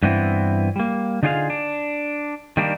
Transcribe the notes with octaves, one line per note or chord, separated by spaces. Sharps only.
G2 E3 B3 C4 E4
G3 A#3
D3 D#4 F4 G#4 D5 F5
D4
D#3 G3 A#3 D4